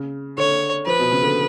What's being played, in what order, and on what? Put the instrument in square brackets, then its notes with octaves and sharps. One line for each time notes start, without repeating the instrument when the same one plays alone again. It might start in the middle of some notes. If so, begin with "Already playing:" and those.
Already playing: [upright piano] C#3
[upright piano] D3 [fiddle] C#5
[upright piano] F3 [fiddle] B4
[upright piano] B2
C#3
D3